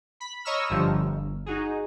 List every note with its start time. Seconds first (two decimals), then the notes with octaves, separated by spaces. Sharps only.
0.20 B5
0.45 C#5 D#5 A#5 C#6 E6 F6
0.69 G1 G2 D3 F3
0.99 G1
1.46 D#4 F#4 G#4